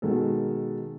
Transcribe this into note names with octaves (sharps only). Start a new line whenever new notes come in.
B2 D#3 G#3 A4